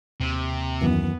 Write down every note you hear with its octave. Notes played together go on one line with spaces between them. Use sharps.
D#2 C3
F#2 D#3 E3 B3